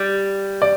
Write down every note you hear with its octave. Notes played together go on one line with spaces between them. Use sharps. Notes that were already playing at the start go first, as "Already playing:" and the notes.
Already playing: G3
D5